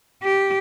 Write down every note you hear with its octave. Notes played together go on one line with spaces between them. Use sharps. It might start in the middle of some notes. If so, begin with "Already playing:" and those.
G4